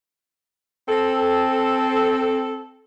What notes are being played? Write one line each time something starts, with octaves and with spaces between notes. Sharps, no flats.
C4 A4